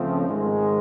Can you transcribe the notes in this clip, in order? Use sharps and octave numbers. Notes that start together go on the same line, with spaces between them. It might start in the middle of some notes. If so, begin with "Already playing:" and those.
Already playing: C#2 C#3 F3 A3 C4
G#2 D#3 G#3